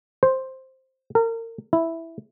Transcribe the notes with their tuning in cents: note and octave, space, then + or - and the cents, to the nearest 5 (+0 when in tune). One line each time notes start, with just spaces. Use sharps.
C5 +5
A#4 -35
E4 +0